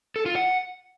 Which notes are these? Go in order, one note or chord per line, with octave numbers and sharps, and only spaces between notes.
A4
F4
F#5